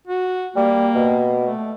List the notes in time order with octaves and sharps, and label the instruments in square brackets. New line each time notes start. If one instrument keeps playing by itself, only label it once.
[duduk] F#4
[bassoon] G3 [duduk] A#3
[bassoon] B2
[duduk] A3